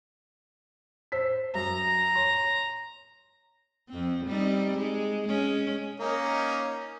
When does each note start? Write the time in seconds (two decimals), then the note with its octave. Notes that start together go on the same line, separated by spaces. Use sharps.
1.12 C5 E6 B6
1.55 F#2 A#5
2.15 C#5 C6
3.89 F2 C4
4.26 G3 C4 D#4
4.76 G#3
5.28 G#3 C#4
6.00 A#3 C#4 D#4